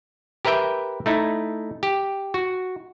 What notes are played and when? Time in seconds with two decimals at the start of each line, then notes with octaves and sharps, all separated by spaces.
0.45 G4 A#4 B4 E5 G5
1.06 A3 D#4 E4
1.83 G4
2.34 F#4